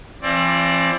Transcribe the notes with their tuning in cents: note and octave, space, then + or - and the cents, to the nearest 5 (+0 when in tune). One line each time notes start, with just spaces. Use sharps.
F3 -45 C4 +30 D5 +0